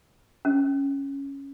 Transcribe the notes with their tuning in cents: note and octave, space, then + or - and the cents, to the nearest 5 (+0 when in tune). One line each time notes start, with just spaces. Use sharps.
C#4 -5